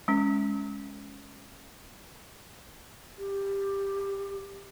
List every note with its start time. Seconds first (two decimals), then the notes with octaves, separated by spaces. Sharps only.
0.08 G#3 C#4
3.18 G4